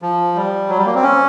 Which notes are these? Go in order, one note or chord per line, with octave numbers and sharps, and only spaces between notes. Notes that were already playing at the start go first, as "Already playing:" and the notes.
F3
G3
F#3
G3
A#3
C4
C#4